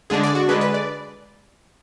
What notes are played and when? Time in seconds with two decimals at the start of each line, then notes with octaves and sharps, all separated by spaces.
0.10 D3 G#3 D4 G#4
0.23 D5
0.35 F#4
0.48 D3 G#3 D4 B4
0.61 B4
0.74 D5